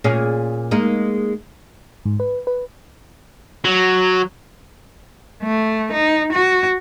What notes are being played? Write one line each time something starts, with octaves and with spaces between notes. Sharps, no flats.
A#2 C#4 G#4
G#3 A#3 D#4
G#2
B4
B4
F#3
A3
D#4
F#4